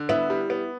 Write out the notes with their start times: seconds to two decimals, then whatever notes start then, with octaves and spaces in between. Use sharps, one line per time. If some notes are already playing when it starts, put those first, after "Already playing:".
Already playing: D3
0.09 B3 E4
0.30 G3
0.50 B3